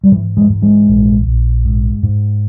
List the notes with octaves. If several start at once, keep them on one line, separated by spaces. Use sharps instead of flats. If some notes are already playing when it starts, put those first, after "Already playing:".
G3
G#2 E3
E3 G#3
G#2
E3 G#3
A#1
A#1
G#2
G#2